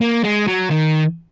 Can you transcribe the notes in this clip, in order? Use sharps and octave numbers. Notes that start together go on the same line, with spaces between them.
A#3
G#3
F#3
D#3